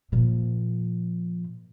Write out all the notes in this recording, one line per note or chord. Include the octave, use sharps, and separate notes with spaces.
A#2 F3